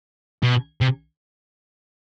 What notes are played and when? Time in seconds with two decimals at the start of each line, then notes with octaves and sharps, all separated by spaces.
0.43 B2
0.81 C3